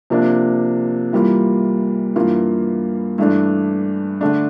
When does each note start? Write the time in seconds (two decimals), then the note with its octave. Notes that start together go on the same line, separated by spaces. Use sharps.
0.10 C3 F3 A#3 D4
1.13 E3 G3 A#3 F4
2.16 G2 E3 A#3 F4
3.18 G2 E3 A3 D4
4.21 D3 A3 D4